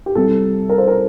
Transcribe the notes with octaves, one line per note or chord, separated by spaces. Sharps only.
G4
C2 C3 G3 A4
A#4
C5
A#4